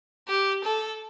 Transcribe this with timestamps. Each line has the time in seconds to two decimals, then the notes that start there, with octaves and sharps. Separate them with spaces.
0.28 G4
0.63 A4